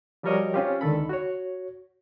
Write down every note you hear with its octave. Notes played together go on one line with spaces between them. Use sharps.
F3 G3 F#4 A#4 C#5 D#5
C4 C#4 F4 G4
C#2 D3 D#3 A4 B5
F#4 C#5